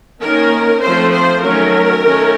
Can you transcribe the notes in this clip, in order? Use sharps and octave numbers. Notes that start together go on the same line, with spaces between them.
D#3 A#3 C#4 A#4
F3 A3 C4 C5
C5
D#3 F#3 A3 C#4 A#4
D#3 A3 C#4